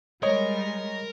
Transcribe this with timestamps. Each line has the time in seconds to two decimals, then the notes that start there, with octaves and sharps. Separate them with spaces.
0.23 G3 G#3 A#4 C#5 D#5